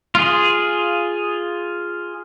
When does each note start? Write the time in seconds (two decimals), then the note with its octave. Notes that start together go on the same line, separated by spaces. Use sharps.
0.15 F4 G#4